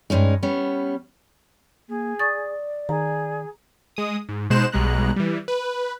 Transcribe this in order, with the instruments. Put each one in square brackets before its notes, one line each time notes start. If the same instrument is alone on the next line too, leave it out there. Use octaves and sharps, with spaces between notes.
[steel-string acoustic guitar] G2 G#3 C#4 D#4
G3 B3 C#4
[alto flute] A#3 [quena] G#4
[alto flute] D5 [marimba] C#6 D#6 A6
[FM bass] D#3 [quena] G#4 [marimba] A#5
[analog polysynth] G#3 D#6
G#2
B2 G#3 D#4 C5 F#6 E7
B1 B2 G3 G#3 A#5 F#6
E3 G3
B4